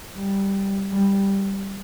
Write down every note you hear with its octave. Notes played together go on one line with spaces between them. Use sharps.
G3
G3